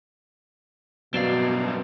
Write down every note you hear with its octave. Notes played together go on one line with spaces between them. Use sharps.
G2 B2 F#3 C4 D5 F5